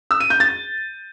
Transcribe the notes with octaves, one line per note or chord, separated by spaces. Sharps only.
E6
D#7
G6
A6